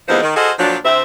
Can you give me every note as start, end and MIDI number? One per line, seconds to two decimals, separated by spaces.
0.08 0.21 39
0.08 0.21 52
0.08 0.21 53
0.08 0.21 56
0.08 0.21 59
0.08 0.21 72
0.23 0.33 51
0.36 0.52 66
0.36 0.52 68
0.36 0.52 69
0.36 0.52 72
0.36 0.52 75
0.36 0.52 77
0.59 0.76 46
0.59 0.76 53
0.59 0.76 54
0.59 0.76 62
0.85 1.02 38
0.85 1.02 60
0.85 1.02 76